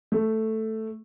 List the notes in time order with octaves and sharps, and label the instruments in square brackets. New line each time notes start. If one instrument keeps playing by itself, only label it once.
[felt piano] A3